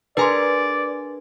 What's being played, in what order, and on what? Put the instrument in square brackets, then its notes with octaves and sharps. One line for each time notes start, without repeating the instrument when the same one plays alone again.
[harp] D4 G#4 A#4 [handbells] B4 G#5 C6 [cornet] D5